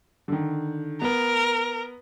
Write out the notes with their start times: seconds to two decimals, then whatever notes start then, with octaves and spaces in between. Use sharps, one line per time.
0.28 D3 D#3
1.02 B3 A#4